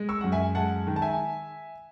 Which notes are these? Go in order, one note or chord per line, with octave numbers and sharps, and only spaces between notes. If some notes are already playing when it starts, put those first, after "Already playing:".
Already playing: G#3
C#6 E6
F#2 F#5
E5 G#5
G#3 F#5 A5
D#3
A5
E5 G#5